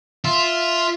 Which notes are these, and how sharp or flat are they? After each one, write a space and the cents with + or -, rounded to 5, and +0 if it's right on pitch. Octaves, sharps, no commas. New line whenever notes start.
F4 +0 E5 +0